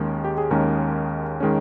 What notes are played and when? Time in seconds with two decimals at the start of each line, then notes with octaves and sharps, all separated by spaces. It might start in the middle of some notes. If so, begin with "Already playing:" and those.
Already playing: D#2 D#3 G#3 C#4
0.24 G4
0.38 G#4
0.51 D#2 D#3 G#3 C#4 A#4
1.40 D#3 G#3 C#4